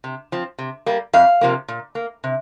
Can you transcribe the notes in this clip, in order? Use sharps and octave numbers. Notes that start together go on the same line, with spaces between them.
C3
F3 C4
C3
G3 A#3
F2 F5
C3 F3 A#3
A#2
A#3
C3